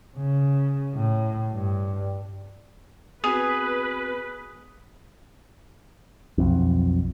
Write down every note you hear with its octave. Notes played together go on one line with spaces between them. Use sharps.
C#3
A2
G2
B3 C4 F#4 G#4 B4
B1 F2